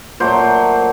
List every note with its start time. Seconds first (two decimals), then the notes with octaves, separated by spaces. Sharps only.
0.20 A#2 F#3 A3 C5